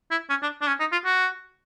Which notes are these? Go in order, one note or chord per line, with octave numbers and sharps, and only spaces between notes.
E4
C#4
D4
D4
C#4
D#4
F4
F#4